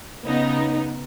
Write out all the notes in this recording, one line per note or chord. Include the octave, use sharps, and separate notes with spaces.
C#3 B3 D#4